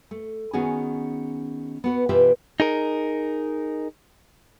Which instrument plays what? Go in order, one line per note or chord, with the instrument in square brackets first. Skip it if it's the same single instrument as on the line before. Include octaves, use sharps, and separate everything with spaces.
[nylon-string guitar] A3
D#3 B3 C#4 F#4 G#4
B3 F#4 B4
B2 E3 F4 G4 B4 E5
[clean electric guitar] D#4 G#4 A#4